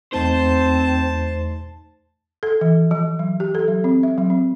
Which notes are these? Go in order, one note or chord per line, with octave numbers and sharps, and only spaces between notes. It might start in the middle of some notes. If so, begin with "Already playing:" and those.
E2 A3 C4 D#4 C5 A5
A4
E3
F3
F#3
G4
A4
F#3
C4
E5
F#3
C4